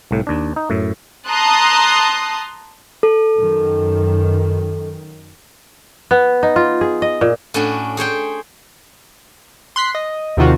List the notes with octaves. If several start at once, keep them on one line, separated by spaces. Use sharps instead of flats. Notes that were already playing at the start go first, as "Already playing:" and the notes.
C2 A2
D#2 D4
D#4
F#2 A2
A5 A#5 C6 D#6 F#6
A4
F#2 D#3
B3
D#4
F4
G#4
D#5
A#2
A2 C#4 D4 F#4
G#4 C5 C#5 G5
C6 F#6 B6
D#5
D#2 C3 D#3 F4 F#4